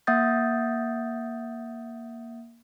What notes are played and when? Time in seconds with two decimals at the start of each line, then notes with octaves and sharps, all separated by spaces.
0.07 A#3 E5 F#5 D#6 G6 A6